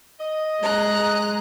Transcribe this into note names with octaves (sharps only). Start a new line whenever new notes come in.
D#5
G#3 A#5 F#6